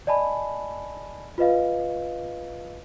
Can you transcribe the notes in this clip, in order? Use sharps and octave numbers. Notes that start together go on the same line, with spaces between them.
D5 D#5 G#5 A5 B5
F4 B4 D#5 F5